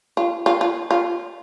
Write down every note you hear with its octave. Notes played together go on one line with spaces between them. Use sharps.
F4
F4
F4
F4